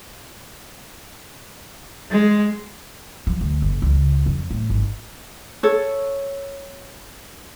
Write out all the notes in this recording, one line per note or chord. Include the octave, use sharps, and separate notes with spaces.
G#3
F3
D2
F#1
C#2
F2
A2
G#1
A4 C#5